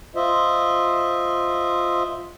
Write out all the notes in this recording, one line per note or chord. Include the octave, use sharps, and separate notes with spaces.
F4 C5 D#5 E5